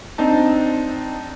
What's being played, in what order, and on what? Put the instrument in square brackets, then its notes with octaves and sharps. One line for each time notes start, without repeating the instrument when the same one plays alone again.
[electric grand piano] C4 D4 D#4 A5